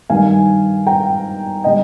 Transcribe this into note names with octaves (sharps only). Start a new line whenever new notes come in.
G2 D#3 G3 F5 G#5
G5 A#5
D3 G3 D#5 G5